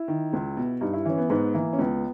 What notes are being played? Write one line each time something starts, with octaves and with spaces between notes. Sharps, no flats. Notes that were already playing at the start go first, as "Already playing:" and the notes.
Already playing: E4
D#3
C#2
B2
G2 D#4
E4
E3 C#4
B3
G#2 B3
E3 A#3
C#4
C#2 B3